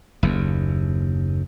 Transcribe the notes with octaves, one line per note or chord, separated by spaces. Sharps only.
F#1 D#2